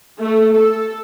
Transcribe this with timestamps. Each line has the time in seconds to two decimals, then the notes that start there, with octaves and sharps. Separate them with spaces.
0.21 A3
0.56 A4